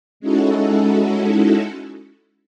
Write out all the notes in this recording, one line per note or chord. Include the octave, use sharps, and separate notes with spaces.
G#3 C#4 D#4 E4 F#4 A4